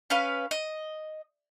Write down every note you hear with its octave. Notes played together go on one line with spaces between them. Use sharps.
C#4 B4 F5
D#5